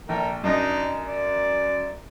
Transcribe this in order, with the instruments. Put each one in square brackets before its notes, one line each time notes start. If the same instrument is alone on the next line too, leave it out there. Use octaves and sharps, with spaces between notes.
[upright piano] A#1 [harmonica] A4 A#4 G5
[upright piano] F#2 D#5 A#6 [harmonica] D4 D#4
[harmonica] D5